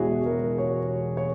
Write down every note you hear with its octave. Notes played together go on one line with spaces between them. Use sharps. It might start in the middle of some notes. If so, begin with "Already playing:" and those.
Already playing: E1 E2 B2 G#3 E4 F#4 G#4 C#5
A#4
C#5
C#5